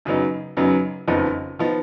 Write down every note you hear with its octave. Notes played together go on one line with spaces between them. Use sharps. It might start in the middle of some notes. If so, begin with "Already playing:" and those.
F#2 C#3 F#3 B3 D#4
F#2 C#3 F#3 B3 D#4
F#1 F2 F3 B3 D#4
F3 B3 D#4